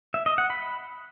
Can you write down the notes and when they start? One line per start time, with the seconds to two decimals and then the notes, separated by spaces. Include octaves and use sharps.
0.14 E5
0.26 D#5
0.38 F#5
0.50 B5